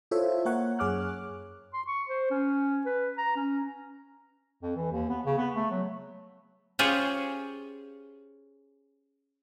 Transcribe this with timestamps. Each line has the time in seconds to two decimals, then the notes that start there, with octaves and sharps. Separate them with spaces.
0.11 E4 F4 A4 C5 C#5 E5
0.45 A#3 A#4 C#5 F#5
0.79 F#2 G#4 C#5 D6 F6 F#6
1.73 C6
1.87 C#6
2.09 C5
2.31 C#4
2.86 B4
3.17 A#5
3.36 C#4
4.62 F2
4.76 E3
4.91 D#2
5.09 B3
5.26 C#3
5.38 B3
5.54 A3
5.70 F#3
6.79 C#4 F4 G4 G#4 C5 C#5